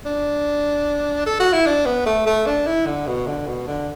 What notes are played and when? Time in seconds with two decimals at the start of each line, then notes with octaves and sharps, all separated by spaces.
0.06 D4
1.26 A4
1.40 F#4
1.53 E4
1.66 D4
1.86 B3
2.06 A3
2.26 A3
2.46 D4
2.67 E4
2.86 D3
3.07 B2
3.27 D3
3.47 B2
3.67 D3